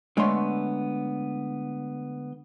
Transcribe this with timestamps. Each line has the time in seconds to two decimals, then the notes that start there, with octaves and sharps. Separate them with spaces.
0.17 D3 G#3 A3 B3 C#5 C6